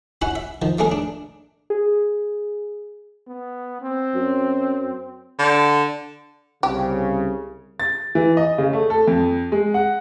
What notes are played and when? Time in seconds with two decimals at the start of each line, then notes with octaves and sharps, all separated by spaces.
0.22 C#4 E4 F#4 C#5 F#5 G#5
0.35 E5
0.62 D#3 F3
0.79 A3 A#3 C#4 G#4 A#4
0.92 D4
1.70 G#4
3.28 B3
3.82 C4
4.15 F#2
5.39 D3
6.63 C2 C#3 G4
7.80 A6
8.15 E3
8.37 D#5
8.58 C#3
8.73 A3
8.90 A4
9.08 F2
9.52 G#3
9.74 F#5